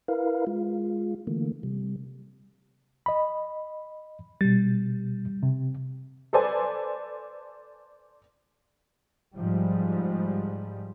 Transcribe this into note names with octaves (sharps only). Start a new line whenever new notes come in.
E4 A#4 B4 F5
G#3 F4
D3 E3 A3 A#3
C3 G3
D#5 B5
B2 G3 A6
C3
A4 B4 C5 D5 G#5 A5
G#2 F3 G3